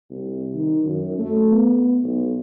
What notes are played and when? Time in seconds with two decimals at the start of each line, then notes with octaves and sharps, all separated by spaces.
0.11 C2
0.54 D#3
0.85 F#2
1.19 A3
1.52 B3
2.04 B1